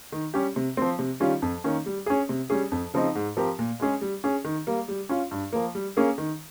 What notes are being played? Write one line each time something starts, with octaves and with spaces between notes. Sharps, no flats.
D#3
G3 C#4 G4
C3
F3 C4
C3
D#3 G3 C#4 F4
F2
D#3 A#3 C#4
G3
C#4 G#4
C3
G3 C#4 G#4
F2
C#3 F3 C4 D#4
G#2
F3 C4 G4 A#4
A#2
G#3 C#4 G#4
G3
C#4 G#4
D#3
G3 A#3
G3
C#4 F4
G2
F3 A#3
G3
A#3 C#4 G#4
D#3